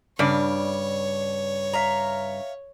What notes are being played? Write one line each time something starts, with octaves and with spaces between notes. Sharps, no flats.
G2 C#3 C#5 D5
E5 F5 A#5